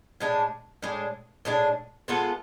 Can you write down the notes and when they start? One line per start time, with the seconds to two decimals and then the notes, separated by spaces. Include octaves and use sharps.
0.20 A2 G#3 D4
0.82 A2 G#3 D4
1.45 A2 G#3 D4
2.08 G#3 B3 F4 A4